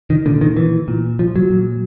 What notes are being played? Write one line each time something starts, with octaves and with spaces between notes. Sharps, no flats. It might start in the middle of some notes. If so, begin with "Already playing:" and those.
D#3
A#2 D3
D#3
E3
A#2
F3
F#3
A#2